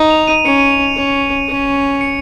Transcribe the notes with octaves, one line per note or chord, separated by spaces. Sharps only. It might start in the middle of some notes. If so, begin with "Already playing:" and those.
Already playing: D#4
F7
D#7
C#4 C#7
D#7
F7
F7
C#4
C#4
C#7